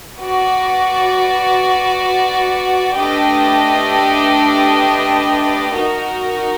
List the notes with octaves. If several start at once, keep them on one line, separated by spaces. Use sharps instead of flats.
F#4 B4 D5
A3 D4 G4 B4 D#5
D#4 F#4 A#4